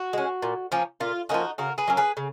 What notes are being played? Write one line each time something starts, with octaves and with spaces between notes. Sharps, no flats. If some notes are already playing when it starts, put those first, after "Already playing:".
Already playing: F#4
G#3 C#4
A#2
F3 A#3 C#4
A#2 F4
F3 A#3 C#4 D#4 F#4
C#3 F#4 A#4
G#4 B4
F#3 A#3 C#4
G#4 B4
C#3